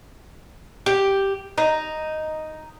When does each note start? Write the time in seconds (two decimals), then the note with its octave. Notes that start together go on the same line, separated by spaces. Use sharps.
0.86 G4
1.58 D#4